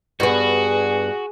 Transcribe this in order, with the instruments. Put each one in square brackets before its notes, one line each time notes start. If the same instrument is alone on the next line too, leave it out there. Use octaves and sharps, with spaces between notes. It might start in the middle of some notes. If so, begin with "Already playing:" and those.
[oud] G2 B3 [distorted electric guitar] F#4 [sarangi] G#4